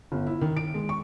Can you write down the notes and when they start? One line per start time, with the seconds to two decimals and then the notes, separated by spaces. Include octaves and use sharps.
0.12 G1
0.27 E4
0.41 D#3
0.57 D7
0.74 G#3
0.89 C#6